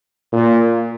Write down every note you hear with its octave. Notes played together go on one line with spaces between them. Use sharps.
A#2